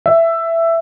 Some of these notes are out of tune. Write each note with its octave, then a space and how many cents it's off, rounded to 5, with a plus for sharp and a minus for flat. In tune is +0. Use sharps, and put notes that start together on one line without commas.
E5 +10